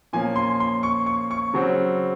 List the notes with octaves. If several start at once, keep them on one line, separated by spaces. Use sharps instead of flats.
A#2 F3 A#3 C#4 G#5
C6
C6
C#6
C#6
C#6
C#3 F#3 C4